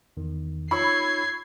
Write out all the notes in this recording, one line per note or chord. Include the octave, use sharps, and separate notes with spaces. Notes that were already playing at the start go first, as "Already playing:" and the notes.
E2 D#3
D#4 F4 C#5 B5 C#6 E6 G#6 C7